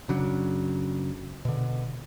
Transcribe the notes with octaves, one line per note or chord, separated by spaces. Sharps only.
F#1 C#3 F#3 D4
B2 D3